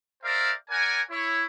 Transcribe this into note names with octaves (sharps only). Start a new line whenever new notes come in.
A#4 C5 D5 E5 F5 G5
A#4 D5 F#5 G#5
E4 C#5